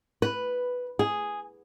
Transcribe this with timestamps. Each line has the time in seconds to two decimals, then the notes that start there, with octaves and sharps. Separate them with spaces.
0.22 B4
0.99 G#4